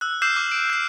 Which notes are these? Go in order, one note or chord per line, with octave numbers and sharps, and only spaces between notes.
E6 F#6
D6 E6 F6 G6 C7 E7
D6
D7
G6 C7